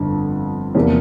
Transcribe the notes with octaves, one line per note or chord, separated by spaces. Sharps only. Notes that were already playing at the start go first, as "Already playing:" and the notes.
Already playing: G1 F2 D3
E2 C3 F3 A#3